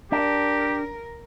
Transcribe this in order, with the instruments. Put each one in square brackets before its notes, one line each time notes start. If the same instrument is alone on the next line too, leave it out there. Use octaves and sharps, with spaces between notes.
[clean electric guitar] D4 [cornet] G4 [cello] A#4